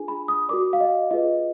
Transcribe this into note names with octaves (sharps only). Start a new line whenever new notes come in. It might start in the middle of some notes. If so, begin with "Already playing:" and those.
Already playing: D4 F4 G#4 G#5
B5
D#6
F#4 A#4 D5 D6
F5
D#5
F4 G#4 B4 D#5